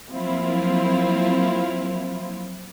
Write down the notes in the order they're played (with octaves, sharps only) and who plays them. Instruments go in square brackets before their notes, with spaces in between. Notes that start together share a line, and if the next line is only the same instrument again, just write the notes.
[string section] F3 F#3 A#3 C4 E4 F4